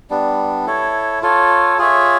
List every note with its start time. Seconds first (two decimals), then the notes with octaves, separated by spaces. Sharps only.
0.10 G3 B3 D4
0.66 E4 A4 C#5
1.22 F4 A4 C#5
1.78 F4 G#4 C#5 E5